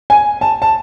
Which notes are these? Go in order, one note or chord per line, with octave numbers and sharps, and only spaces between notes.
G#5
A5
A5